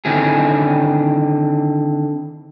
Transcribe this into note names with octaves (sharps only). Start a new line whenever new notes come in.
D3 D#3 C4 E4 G#4